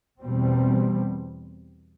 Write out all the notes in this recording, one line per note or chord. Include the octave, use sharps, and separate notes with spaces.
E2 B2 G3 C4